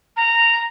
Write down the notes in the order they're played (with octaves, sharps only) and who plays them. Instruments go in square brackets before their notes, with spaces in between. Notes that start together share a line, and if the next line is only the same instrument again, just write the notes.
[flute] A#5